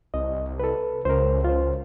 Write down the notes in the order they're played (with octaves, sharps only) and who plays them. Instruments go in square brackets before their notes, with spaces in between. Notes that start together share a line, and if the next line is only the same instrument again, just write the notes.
[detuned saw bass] C2 [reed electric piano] D#5
[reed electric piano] A4 B4
[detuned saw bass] C#2 [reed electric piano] A#4 C5
[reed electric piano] F4 C5